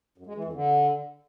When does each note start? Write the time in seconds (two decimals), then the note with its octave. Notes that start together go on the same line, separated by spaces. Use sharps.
0.18 F#2
0.27 G#3
0.35 E3
0.44 F2
0.53 D3